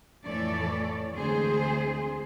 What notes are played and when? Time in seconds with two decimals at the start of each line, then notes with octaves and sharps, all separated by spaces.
0.25 F2 A2 E3 A4 C#5 D5
1.16 D2 E3 G#3 C4 G#4 C5